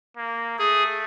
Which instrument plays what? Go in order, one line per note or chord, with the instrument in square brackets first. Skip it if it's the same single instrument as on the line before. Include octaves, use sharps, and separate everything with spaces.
[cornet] A#3
[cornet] A3 [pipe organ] G#4